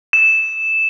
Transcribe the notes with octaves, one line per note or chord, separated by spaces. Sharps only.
E7